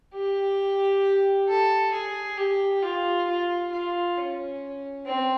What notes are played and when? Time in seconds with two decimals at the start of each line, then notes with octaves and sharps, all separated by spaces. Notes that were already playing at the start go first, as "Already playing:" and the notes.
0.15 G4
1.49 A4
1.93 G#4
2.37 G4
2.82 F4
3.27 F4
3.72 F4
4.17 C#4
5.06 C4